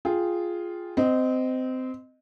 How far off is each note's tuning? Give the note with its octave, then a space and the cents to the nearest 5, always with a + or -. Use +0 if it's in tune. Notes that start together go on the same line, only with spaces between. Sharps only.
F4 +0 G#4 +0 G5 +0
C4 -20 D#5 -5